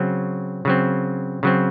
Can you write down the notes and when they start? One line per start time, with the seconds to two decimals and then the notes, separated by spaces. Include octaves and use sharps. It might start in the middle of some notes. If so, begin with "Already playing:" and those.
Already playing: C#3 F#3 C4
0.65 C#3 F#3 C4
1.43 C#3 F#3 C4